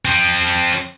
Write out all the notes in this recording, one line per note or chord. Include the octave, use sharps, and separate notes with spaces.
F3 C4